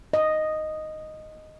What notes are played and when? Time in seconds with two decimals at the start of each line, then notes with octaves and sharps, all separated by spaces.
0.13 D#5